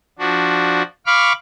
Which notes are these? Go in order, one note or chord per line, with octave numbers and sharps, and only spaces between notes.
F3 D4 F#4
F5 B5 C#6 D6 F6